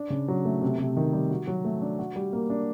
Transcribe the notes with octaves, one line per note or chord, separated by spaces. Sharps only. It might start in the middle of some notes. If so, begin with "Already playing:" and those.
Already playing: D4
C#3
F#3
A3
C3
C3
D#3
G3
F#4
F#3
A3
D4
F#4
G3
A#3
D4